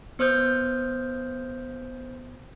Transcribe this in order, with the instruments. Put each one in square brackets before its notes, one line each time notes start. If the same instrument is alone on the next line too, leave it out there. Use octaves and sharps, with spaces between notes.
[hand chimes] B3 C5 D#6 F6 G6